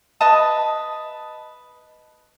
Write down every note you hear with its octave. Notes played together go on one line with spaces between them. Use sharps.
B4 D#5 A5 D#6